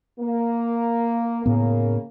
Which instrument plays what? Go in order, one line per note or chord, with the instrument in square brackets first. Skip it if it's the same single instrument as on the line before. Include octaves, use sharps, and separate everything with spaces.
[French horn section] A#3
[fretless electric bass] A2 B3 [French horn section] C#3 A#3